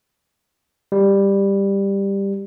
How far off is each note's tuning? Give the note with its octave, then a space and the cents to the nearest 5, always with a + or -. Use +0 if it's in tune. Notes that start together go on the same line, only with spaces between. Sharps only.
G3 +10